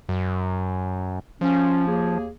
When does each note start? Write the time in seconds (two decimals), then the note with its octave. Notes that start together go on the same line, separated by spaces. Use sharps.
0.09 F#2
1.41 F3 C#4
1.87 D#2 A#3 G#4